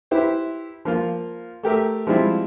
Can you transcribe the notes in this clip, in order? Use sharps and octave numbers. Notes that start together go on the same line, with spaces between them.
E4 G4 B4 C5
F3 A#3 F4
A3 G4 A#4 E5
F3 G3 G#3 C4 E4 F4